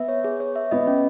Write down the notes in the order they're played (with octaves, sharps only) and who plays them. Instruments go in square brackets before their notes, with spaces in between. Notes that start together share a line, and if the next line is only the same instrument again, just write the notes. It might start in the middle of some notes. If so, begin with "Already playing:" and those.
Already playing: [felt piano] B3 [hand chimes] E5
[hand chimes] C#5
G#4
C#5
E5
[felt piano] B3 [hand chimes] D#5
[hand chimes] C#4